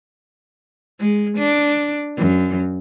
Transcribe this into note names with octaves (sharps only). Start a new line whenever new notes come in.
G#3
D4
F#2